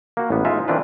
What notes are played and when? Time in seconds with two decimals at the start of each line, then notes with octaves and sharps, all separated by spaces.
0.17 A#3 F#4
0.30 A1 B3
0.45 G#3 D#4 F4 E5
0.68 D#3 E3 C4 D4 F4 B4